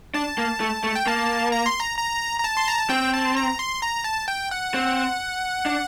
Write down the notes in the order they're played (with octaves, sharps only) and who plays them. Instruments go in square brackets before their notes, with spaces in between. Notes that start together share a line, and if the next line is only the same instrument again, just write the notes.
[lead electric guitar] D4 [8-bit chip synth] A5
[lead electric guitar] A#3
A3
A3
[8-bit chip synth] G5
[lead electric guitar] A#3 [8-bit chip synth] A5
[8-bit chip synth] A#5
C6
A#5
A#5
A#5
A5
C6
A#5
A5
[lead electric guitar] C4 [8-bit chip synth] G5
[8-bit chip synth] A5
A#5
C6
A#5
A5
G5
F#5
[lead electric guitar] C4
D4